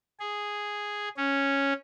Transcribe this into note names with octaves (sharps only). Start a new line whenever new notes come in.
G#4
C#4